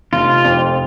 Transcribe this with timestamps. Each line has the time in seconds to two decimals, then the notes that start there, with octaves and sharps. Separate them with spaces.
0.13 F1 F4
0.44 F2